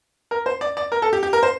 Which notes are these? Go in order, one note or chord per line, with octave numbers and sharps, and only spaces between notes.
A#4
C5
D5
D5
A#4
A4
G4
G4
A#4
C5